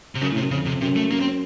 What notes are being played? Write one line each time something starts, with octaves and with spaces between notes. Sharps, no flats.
C3
F#2 C#3
A2
C3
F#2
F2 C#3
C3
F#2 C3
A3
F#2 A#3
C4